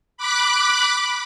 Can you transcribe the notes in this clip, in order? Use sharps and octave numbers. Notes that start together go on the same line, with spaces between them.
B5 D6 F#6